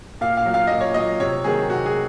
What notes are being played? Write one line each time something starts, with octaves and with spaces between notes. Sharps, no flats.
A#2 F5
F5
F#3
F5
A#2 D#5
C#5
F#3 D#5
C3 C#5
D#3 F#3 G#4
C3 F#4
G#4